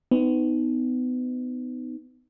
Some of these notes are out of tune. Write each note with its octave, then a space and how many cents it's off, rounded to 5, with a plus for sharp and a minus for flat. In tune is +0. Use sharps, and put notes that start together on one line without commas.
B3 +30 D#4 +0